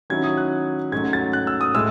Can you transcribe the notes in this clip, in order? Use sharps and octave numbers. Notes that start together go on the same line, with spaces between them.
D#3 F#3 C#4 E4 G#6
D#6
F#6
G#2 F#3 A3 C#4 G#6
A6
F#6
E6
D#6
A2 G#3 E6